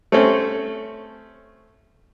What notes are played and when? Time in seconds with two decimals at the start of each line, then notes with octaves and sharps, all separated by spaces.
0.12 A3 C4 C#4